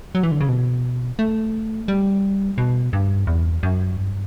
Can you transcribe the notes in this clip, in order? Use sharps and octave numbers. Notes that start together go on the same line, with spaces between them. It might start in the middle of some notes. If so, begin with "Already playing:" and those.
F#3
E3
D3
C#3
B2
A3
G3
B2
G2
E2
F#2
G2